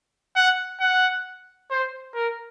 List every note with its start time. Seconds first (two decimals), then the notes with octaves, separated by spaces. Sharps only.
0.36 F#5
0.80 F#5
1.71 C5
2.14 A#4